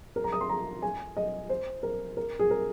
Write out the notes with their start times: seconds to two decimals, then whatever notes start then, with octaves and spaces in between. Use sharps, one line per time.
0.16 A#4
0.24 A#5
0.32 D#6
0.41 C6
0.49 A#5
0.82 G#5
1.17 D#5
1.49 C5
1.83 A#4
2.17 A#4
2.39 G#4
2.51 A#4